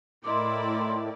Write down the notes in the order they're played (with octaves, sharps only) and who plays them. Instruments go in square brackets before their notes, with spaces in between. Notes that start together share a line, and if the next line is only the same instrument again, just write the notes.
[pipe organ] A2 [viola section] E4 A#4 D5 [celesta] D#5 D6 [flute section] C6